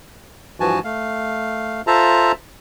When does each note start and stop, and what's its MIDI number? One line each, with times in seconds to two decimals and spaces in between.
0.60 0.79 43
0.60 0.79 52
0.60 0.79 53
0.60 0.79 66
0.60 0.79 80
0.60 0.79 81
0.84 1.81 57
0.84 1.81 77
1.87 2.32 65
1.87 2.32 69
1.87 2.32 72
1.87 2.32 76
1.87 2.32 81
1.87 2.32 82